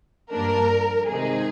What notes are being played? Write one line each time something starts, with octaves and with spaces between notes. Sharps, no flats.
G2 F3 A#3 D4 A#4
C3 D#3 G#3 D#4 G#4